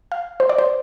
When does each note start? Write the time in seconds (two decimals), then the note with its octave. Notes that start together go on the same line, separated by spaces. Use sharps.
0.12 F5
0.40 C5
0.49 D5
0.59 C5